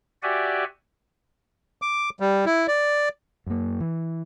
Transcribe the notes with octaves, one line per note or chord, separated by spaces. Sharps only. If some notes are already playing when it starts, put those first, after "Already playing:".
F#4 G4 D5 E5 F#5 G#5
D6
G3
E4
D5
F#2 A#3
E3